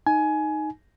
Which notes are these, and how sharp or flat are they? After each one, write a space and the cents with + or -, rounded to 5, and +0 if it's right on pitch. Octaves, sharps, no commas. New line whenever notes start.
D#4 +0 G#5 +20